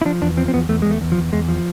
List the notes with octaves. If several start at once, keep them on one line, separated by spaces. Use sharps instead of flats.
E4
F3 D4
E2 D4
F3 C4
C4
E2 B3
E2 A3
G#3
E2
A3
E2
F3
E2
E2 G#3
F3